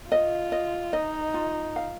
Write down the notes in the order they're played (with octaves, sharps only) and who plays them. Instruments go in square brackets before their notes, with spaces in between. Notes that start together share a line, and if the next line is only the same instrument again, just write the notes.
[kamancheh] F4 [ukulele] D#5
[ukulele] D#5
[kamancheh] D#4 [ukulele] D#5
[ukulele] F4
F5